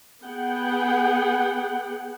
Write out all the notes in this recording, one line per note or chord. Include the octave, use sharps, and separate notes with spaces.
B3 G#4 F#5 G5